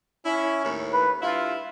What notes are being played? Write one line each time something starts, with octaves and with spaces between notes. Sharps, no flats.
C#4 E4
D#2 A2
B4
G2 E4 F4